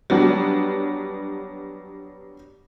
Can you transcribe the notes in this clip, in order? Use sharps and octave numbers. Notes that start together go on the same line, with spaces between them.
F#3 G3 B3 D4